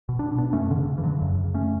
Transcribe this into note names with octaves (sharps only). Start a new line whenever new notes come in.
B2
D4
B2
B3 D4
F#2 A3 C#4
D3
C#3
C#3 E3
D3 F#3
F#2
C#3
A3 C#4